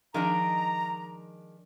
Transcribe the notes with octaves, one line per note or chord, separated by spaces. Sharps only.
D#3 F3 G#3 D4 A#5